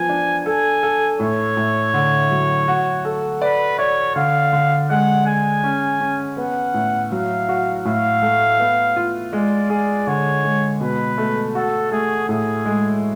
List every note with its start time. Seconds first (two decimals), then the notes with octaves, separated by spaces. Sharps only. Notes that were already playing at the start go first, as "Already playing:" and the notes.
Already playing: F3 B3 G#5
0.09 D4
0.46 A4 G#5
0.83 A4
1.20 A2 C#5
1.57 A2
1.94 D3
2.31 F#3
2.68 F#4
3.05 A4
3.42 B4 D5
3.79 C#5 D5
4.15 D3 F5
4.53 D3
4.89 G#3 F#5
5.26 G#4 G#5
5.63 C#4
6.01 C#4
6.37 B3 F#5
6.74 A2
7.11 F#3 F5
7.49 F#4
7.85 A2 F5
8.22 A3
8.59 B3
8.96 F4
9.33 G#3 D5
9.70 G#4 D5
10.07 D3 C#5
10.44 G#3
10.81 B2 B4
11.18 A3
11.55 F#4 A4
11.92 A3 G#4
12.28 A2 G#4
12.65 G#3